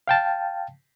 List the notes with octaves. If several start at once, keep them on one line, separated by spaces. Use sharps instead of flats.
F5 G5 A5